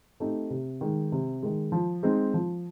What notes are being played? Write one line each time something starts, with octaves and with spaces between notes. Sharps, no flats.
A3 C4 D#4 G4
C3
D#3 G#3
C3
D#3 G#3
F3
G#3 C4 D#4
F3